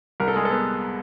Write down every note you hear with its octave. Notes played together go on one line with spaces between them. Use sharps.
C2 A#4
A4
G#3 G#4
A4
B3